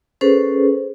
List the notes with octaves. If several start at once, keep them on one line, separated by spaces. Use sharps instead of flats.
C#4 G#4 A4 B4 C5